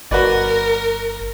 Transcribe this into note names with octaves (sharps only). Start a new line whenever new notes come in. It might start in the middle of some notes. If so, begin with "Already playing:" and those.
G1 F#4 A#4 B4 D5